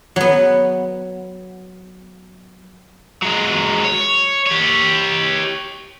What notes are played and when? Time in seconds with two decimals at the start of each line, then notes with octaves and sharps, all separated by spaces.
0.16 F#3 B3
3.23 F#3 G#3
3.84 C#5
4.46 G4 C#5